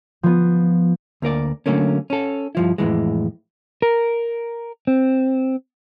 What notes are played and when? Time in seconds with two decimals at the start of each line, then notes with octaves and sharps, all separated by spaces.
0.23 F3 B3
1.22 D2 A#3 A#4 D5
1.66 D3 D#3 F#3 A3 A#3 C#4
2.10 C#4 A4
2.55 G2 F3 E4
2.78 F2 A2 E3 G#3
3.82 A#4
4.87 C4